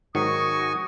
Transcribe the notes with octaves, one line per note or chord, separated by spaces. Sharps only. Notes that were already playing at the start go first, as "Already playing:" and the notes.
G#2 D#3 F#3 F#4 G#5 C#6 D#6